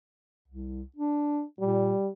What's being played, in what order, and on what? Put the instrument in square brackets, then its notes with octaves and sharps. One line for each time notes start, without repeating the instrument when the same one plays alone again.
[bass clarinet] C2
D4
[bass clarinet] A#2 [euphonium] G3